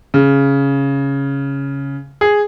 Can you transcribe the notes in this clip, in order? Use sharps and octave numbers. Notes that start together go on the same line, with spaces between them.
C#3
G#4